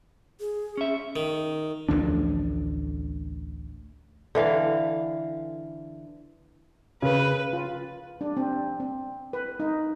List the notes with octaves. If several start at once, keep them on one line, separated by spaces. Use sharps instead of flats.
G#4
C#4 E5
D#3
A1 D2 F3 D4
D3 E3 F5
C#3 B4
F4
D4
C4
C4
B4
D#4